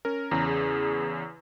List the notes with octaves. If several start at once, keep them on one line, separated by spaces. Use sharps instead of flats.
C#4 A#4
E2 C#3 A#5
G#4